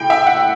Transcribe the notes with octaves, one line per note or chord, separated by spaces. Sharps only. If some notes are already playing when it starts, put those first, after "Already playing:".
Already playing: A2 G5
E5
F#5